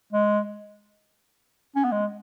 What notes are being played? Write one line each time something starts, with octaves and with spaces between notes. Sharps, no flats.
G#3
C#4
B3
G#3